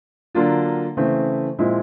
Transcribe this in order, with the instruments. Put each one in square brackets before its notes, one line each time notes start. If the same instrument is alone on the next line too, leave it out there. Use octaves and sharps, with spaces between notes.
[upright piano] D3 F#3 A#3 D4 F4
C#3 E3 A3 C4
A#2 F3 G#3 C4 E4